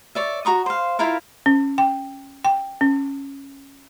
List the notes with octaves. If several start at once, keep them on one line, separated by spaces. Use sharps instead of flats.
C#5 D5 E5
F#4 A#5 C#6 D#6
C5 F5
E4 F4 A#4 F5
C#4
G5
G5
C#4